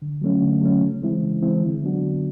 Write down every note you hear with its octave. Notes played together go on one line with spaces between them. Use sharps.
D3
F#3 A3 C#4
D3
F#3 A3 C#4
C#3
E3 G#3 C4 E4
C#3
E3 G#3 C4 E4
D3
F#3 B3 D4 F#4
D3